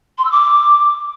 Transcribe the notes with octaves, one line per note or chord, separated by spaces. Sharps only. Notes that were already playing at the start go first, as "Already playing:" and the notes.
C6
E6
D6